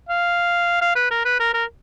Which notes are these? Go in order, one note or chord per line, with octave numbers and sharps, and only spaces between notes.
F5
F5
B4
A#4
B4
A#4
A#4